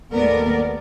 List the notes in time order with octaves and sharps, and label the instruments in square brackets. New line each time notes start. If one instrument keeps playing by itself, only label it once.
[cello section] D#2 A3 B3 A#4 D5